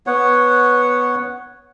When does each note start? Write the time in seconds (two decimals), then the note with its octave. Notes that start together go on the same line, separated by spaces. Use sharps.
0.07 B3 C#5 F#5